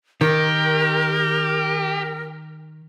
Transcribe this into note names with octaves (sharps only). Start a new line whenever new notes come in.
D#3 G4 A#4